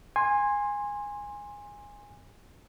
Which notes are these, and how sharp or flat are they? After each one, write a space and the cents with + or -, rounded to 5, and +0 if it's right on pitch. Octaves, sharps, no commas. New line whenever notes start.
G#5 -15 C6 +15